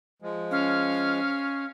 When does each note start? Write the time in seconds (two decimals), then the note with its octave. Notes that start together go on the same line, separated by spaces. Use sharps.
0.22 F3 G#3
0.51 C#4 F5